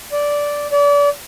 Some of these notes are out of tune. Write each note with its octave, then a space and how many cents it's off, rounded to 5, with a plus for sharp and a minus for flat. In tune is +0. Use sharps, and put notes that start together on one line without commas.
D5 -10
D5 -35